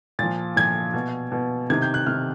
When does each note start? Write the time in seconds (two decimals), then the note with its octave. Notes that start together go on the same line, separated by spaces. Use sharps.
0.19 A#2 F3 A6
0.56 A#2 F3 G#6
0.94 B2
1.32 B2
1.70 C3 D#3 G#6
1.82 G6
1.94 F#6
2.06 C3 D#3 F6